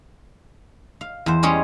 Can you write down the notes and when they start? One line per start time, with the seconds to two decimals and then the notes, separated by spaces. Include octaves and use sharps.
1.01 F5
1.26 E2 C5
1.43 G3 G#3 C#4 G#4 C#5